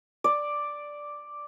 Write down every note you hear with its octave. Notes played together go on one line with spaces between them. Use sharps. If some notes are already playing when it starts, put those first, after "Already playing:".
D5